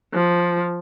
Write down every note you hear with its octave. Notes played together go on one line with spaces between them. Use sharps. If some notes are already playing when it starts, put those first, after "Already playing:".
F3